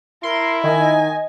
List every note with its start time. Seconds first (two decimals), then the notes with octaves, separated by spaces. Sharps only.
0.23 E4 A#4 C6
0.64 D#3 D#5 G#5